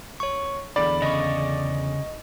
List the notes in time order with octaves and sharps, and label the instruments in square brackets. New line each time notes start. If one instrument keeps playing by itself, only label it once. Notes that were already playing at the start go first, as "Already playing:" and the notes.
[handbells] C#5 C#6
[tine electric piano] E2 D3 [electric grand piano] D5 [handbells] B5
[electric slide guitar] C#3 [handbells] D#5 C#6